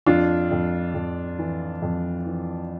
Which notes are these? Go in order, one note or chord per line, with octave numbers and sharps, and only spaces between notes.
F2 D4 F4
F2
F2
E3
F2
E3